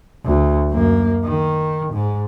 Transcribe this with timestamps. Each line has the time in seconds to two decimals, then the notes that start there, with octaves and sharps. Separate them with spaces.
0.24 D2
0.70 F#2 A#3
1.24 D#3
1.93 G#2